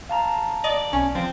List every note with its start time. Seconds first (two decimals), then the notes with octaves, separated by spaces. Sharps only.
0.09 F5 A5 A#5
0.64 D5 D#5
0.92 B1 C#4
1.15 F3 C4